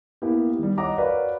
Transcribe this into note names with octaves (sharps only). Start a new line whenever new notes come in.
A#3 B3 E4 G4
D#3 G3
C#5 D#5 F#5 A#5 D6
F#4 A#4 B4 C#5 D5 F5